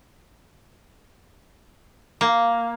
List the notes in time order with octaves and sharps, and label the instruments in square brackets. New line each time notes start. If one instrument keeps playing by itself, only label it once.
[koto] A#3